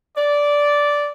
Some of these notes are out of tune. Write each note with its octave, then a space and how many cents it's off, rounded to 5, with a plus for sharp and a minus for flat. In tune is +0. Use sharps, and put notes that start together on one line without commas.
D5 -10